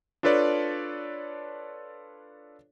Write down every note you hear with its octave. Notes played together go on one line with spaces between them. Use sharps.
D4 F4 A4 B4 C#5 D5